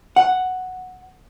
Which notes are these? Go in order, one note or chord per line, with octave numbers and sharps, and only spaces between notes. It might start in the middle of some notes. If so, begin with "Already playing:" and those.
F#5